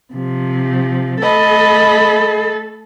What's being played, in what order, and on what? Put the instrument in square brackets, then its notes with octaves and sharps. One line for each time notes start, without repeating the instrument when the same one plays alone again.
[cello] C3 F3
[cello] A3 A4 [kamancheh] D#5 B5